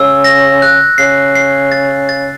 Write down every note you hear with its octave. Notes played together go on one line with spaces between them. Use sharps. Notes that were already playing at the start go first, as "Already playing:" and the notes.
Already playing: C#3 E6
A#6
F#6
C#3 C7
C7
A6
A6